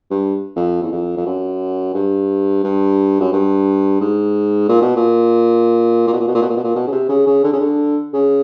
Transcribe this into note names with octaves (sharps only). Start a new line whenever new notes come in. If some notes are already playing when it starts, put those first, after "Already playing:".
G2
F2
E2
F2
F2
F#2
G2
G2
F#2
G2
G#2
A#2
B2
A#2
A#2
B2
A#2
B2
A#2
B2
A#2
B2
A#2
B2
C#3
C3
C#3
C#3
D3
C#3
D3
C#3